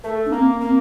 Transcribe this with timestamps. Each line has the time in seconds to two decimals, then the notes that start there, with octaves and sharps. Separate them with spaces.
0.04 A3 A4
0.26 D4
0.32 A#3 C4
0.60 A#3 C4